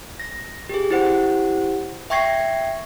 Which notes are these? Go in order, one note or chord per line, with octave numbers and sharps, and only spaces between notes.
A#6
G4 G#4
E4 G4 C5 F#5
E5 G5 C#6 G#6 A#6 C7